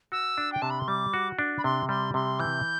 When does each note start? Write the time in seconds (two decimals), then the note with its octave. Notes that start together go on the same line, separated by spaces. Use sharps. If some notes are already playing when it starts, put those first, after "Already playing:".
0.12 F#4 E6
0.38 D4
0.52 G5
0.62 C3 A5
0.70 B5
0.79 C6
0.88 G3 D6
1.14 F#4
1.39 D4
1.58 B5
1.64 C3 C6
1.89 G3 C6
2.14 C3 C6
2.40 E3 G6